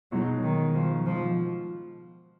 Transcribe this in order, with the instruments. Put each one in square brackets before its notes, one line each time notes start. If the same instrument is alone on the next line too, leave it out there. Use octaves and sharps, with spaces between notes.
[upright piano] B2 G#3 D#4 [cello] F#3
[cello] D#3
F3
F3